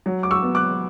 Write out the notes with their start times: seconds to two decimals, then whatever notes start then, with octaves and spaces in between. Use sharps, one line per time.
0.06 F#3
0.23 D6
0.31 C#6 E6
0.43 B3
0.55 D6 F#6